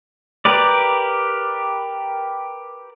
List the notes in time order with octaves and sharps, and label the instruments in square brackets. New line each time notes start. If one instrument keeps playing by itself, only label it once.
[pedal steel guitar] G4 A#4 B4 D5